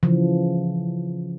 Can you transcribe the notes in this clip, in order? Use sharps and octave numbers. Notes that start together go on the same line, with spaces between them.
C#3 E3 F3